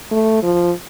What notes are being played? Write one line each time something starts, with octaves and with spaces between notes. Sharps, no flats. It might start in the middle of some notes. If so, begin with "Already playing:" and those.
A3
F3